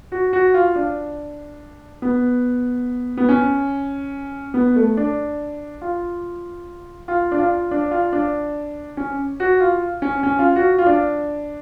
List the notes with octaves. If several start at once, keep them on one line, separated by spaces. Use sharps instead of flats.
F#4
F#4
F4
D4
B3
B3
C#4
B3
A3
D4
F4
F4
D4
F4
D4
F4
D4
C#4
F#4
F4
C#4
C#4
F4
F#4
F4
D4